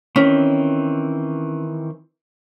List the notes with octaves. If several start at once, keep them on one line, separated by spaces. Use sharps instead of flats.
D#3 E3 C4 C#4